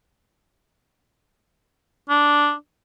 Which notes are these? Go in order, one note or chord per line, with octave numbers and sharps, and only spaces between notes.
D4